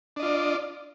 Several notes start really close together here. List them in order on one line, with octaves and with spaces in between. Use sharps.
D4 D#5 F4 D5